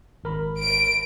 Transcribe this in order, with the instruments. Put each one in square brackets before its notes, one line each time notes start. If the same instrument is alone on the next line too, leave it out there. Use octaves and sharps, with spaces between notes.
[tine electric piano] G#1 A#4 B5
[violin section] D7